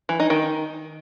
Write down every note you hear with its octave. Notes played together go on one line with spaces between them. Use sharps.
E3
D#4
D#3